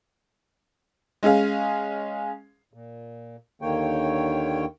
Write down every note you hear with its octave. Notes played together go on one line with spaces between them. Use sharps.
G#3 C#4 G#4 F5
A#2
D#2 D3 D#3 A#3 C#5 G5